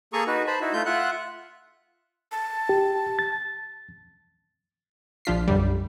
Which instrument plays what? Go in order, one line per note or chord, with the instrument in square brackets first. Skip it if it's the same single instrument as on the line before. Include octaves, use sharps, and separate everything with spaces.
[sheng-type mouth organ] A#3 G#4 A4 A#5 C#6 D#6
D#4 F#4 B4
C5 A5 B5
D#4 E4 F#4
A3 F4 G6
F4 E5 F#5 F#6
[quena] A5
[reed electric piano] G4
A6
[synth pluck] A#1 F3 D4 F4 B6 C7
B1 F#2 D3 G3